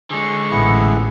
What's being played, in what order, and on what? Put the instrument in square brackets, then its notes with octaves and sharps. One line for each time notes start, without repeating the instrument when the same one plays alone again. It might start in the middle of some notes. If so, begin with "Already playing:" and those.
[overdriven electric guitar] D3 G#3 [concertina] G#4 [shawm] C#6
[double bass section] A1 [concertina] B3 E4 G#4